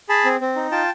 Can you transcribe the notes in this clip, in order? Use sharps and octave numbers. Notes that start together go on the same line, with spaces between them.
G#4 A5 B5
C4
C4
D#4
F4 G5 A5